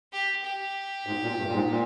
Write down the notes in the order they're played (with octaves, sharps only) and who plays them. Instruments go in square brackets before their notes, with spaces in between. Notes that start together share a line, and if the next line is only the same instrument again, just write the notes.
[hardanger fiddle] G4
G4
[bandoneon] G#2
A#2
G2
A#2
G#2
A#2